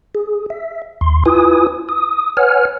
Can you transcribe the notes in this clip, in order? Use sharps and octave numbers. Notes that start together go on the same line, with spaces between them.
G#4
E5
D#2 C6
E4 F4 B4 G#5 D#6
D#6
B4 C#5 F#5 G#5 F6